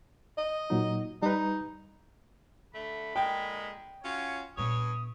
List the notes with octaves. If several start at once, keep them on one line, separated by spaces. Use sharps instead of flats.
D#5
A#2 F#3 D#4
G3 D#4 B4
D3 A3 B5
A#2 D3 G#3 G5
C#4 F4 F#4 C#5
G2 A#2 B3 C#5 D#6